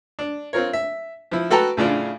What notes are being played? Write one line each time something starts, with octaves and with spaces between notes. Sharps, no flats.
D4
C4 F4 A#4 C#5
E5
F3 E4
F#4 A4 B4 G5 A5 A#5
A2 C#3 D4 F4